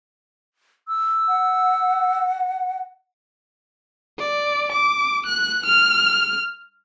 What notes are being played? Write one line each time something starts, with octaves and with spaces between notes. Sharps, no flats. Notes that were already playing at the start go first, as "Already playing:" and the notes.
E6
F#5
D5
D6
F#6
F6